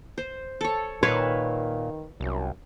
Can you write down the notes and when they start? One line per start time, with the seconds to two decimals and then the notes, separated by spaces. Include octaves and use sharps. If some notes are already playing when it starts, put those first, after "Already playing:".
0.18 C5
0.61 A4 C#5
1.03 A#2 D#3 B4 C#5 E5 F5
2.21 C2 F#2